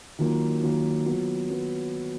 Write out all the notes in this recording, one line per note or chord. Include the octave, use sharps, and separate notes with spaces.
D#3 F#3 A#3 F4
D#3 F#3 A#3 F4
F#3 B3 F4
F#3 B3